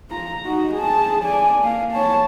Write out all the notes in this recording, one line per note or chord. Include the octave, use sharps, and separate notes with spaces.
F4 A#5
D#4 F#4
G#4 A5
D5 G#5
A#3 F5
C#5 A5